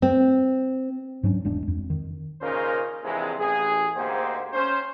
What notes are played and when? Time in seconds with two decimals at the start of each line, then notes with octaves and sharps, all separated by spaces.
0.02 C4
1.23 G#2 F#3 C#4 D4
1.45 E1 G#3 D4
1.68 F2
1.90 D#3
2.41 A#2 C#3 C#4 D#4 A#4 C5
3.04 A#1 C3 E3 G#3
3.39 A1 G#4
3.96 D2 G#2 A#3 G4 C5
4.53 C#4 C5